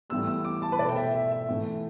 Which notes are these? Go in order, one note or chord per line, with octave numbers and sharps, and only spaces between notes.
A2 E3 G3 B3 E6
E6
D6
A5
B4
B2 A3 D5
G5
E5
E5
E5
A2 E3 A3